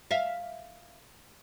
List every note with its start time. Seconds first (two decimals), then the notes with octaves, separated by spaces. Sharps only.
0.11 E5 F5